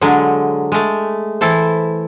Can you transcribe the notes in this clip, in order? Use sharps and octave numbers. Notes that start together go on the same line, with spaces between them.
D3 F#3 G#3
G#3 A3
E3 E4 A4 C5